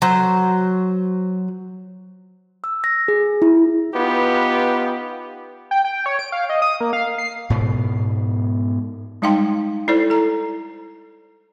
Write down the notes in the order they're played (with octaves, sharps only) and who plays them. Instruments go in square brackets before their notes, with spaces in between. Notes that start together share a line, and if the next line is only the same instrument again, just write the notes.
[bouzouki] F#3 C5
[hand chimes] E6
A#6
G#4
E4
[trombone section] B3 D#4 F4 G4 B4
[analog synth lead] G5
G5
C#5
D7
F5
D#5
D#6
A#3
F5
C7
[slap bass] G#2 B2 B3
[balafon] G3 G#3 D#4 F5 G5 C6
E4 A4 C5 D5
A4 A#5